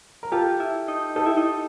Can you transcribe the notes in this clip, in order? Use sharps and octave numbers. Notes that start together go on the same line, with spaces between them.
A#4
F4 G4 A4
E4
D#4
D#4 G4 A4
E4
D#4